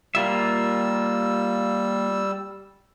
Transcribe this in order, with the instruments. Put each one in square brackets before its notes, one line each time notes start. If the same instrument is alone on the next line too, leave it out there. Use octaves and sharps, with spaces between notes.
[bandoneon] G3 E6 [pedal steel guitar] A#3 F4 E5